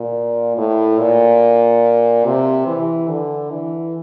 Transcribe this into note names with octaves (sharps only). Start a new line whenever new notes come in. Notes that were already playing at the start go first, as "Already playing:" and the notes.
Already playing: A#2
A2
A#2
C3
E3
D3
E3